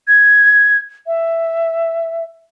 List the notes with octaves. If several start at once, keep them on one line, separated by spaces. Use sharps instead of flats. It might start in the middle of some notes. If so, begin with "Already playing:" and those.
G#6
E5